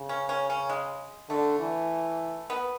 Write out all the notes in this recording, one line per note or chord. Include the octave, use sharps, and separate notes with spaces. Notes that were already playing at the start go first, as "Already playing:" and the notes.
Already playing: C#3
C#4
C#4
C#4
G#3
D3 A3
E3
B3